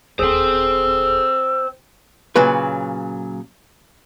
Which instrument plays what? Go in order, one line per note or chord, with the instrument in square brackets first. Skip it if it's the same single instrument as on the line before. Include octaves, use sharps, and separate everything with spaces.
[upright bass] E1 D#2 [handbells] G#4 A4 [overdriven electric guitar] C5 G5 [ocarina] E6
[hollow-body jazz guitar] A#2 C#3 F#3 B4